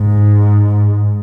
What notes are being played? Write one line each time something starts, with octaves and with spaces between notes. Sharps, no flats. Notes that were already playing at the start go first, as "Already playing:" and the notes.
Already playing: G#2